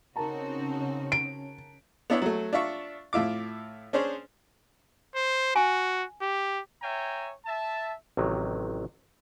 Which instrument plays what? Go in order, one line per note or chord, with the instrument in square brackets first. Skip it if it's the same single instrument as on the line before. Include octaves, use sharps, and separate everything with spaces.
[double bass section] C#3 C#4 [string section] C4 D#4 F#4 [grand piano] A#4 A5 A#5
[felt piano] D7
[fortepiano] B3 D4 E4 C#5 E5
F#3 A3
D4 F4 E5 C#6
A2 E4 F4 D6
C#4 D4 G#4 C5 C#5
[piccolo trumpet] C5
[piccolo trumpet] F#4 [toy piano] G#5
[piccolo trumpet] G4
[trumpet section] C#5 E5 G5 G#5 A#5
E5 A5
[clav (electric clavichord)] A1 C3 D#3 F#3